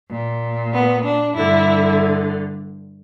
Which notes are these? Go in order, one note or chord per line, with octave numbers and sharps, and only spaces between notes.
A#2
B3
D4
G2 D3 E4